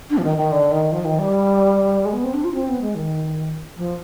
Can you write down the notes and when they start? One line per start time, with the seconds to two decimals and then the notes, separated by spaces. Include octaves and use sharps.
0.10 D4
0.18 F3
0.24 D#3
0.38 D#3
0.52 D3
0.71 D#3
0.92 F3
1.05 D#3
1.19 G3
2.05 G#3
2.13 B3
2.24 C4
2.34 D4
2.44 F4
2.54 C4
2.68 B3
2.81 G#3
2.95 D#3
3.77 F3